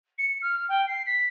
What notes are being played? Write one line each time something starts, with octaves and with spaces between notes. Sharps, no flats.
C#7
F6
G5
C7
B6